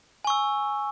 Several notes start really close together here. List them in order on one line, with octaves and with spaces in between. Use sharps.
G#5 C#6 E6